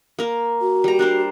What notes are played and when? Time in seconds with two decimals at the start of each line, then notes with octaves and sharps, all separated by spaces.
0.19 A#3 A#4
0.61 F#4
0.84 G3 A#5
0.99 D4 A#4 C5